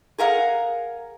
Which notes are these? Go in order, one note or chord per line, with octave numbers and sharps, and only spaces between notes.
G#4 A#4 F5 F#5